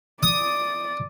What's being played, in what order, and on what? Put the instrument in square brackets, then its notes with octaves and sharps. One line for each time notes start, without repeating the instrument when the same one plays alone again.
[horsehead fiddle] D5 [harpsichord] D#6